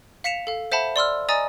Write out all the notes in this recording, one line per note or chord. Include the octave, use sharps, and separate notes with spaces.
F5 B6 C#7 E7 F7
A4 F5
C5 E5 F#5 A5 B5
D5 C6 E6 F6
D5 D#5 G#5 A#5 D#6 A6